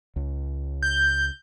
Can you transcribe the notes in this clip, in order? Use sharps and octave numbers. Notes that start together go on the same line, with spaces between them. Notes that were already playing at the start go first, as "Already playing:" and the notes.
C#2
G6